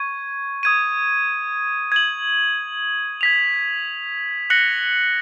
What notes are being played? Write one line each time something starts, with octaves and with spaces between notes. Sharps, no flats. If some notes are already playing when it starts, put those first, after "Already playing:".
Already playing: C#6 G#6 D#7
D#6 G#6 D#7
G#6 D#7 F#7
G#6 B6 F7
F#6 A#6 C#7 F#7